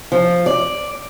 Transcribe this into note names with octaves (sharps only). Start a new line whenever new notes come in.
F3
D5